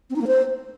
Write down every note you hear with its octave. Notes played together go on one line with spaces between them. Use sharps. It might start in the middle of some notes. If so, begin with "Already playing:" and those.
C4
D#4
A#3
C5